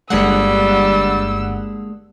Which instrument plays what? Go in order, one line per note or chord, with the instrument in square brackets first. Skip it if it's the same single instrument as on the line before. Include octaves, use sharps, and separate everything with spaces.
[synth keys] G1 F#5 [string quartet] G3 [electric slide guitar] G#3 A#3 D4 [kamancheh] E6